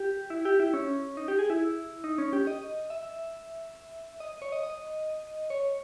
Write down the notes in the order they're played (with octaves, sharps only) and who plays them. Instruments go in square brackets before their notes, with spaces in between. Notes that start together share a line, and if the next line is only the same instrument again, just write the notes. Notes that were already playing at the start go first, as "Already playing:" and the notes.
Already playing: [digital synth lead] G4
E4
G4
E4
C#4
D#4
G4
G#4
E4
D#4
C#4
G4
D#5
E5
D#5
C#5
D#5
D#5
C#5